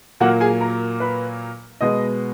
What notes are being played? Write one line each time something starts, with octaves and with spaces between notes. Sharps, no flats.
A#2 F#3 A#3 F#4 F#5
G#4 G#5
A#4 A#5
B4 B5
B2 G#3 B3 D#5 D#6